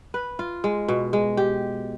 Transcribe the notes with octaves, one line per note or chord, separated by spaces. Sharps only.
B4
F4
G#3
B2
G#3
G4